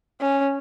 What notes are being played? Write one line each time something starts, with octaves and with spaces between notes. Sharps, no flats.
C#4